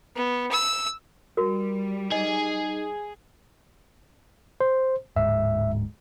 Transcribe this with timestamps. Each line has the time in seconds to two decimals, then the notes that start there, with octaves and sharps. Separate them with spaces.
0.16 B3
0.51 E6
1.37 G3 F#4 A#4
2.12 D#4 G#4 D#5
4.61 C5
5.16 D1 G#2 E5